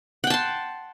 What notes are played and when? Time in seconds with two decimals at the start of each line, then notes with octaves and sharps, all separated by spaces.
0.24 F#5
0.27 G5
0.30 A5
0.34 C6